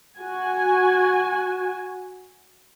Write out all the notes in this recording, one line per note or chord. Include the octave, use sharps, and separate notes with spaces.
F#4 G#5